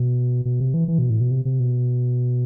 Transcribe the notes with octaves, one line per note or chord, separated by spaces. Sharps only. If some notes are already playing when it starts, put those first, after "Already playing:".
Already playing: B2
B2
C3
E3
E3
B2
A2
B2
C3
C3
B2